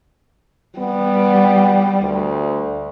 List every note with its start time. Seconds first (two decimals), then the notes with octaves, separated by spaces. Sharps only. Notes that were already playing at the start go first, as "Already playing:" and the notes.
0.78 G3 B3
2.01 D2